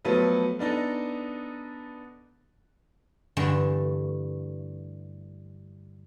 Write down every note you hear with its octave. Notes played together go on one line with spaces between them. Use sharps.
F3 F#3 A3 B3 A4 B4
B3 D4 D#4 A4
G2 D3 E3 A3